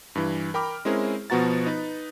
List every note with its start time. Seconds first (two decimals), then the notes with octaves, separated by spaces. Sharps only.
0.15 G2 E3
0.54 A#4 G5 B5 D6 F6
0.85 G#3 C4 C#4 E4 G#4 A#4
1.30 B2 F3 B3 F#4 A#5 A6
1.66 D#4 B4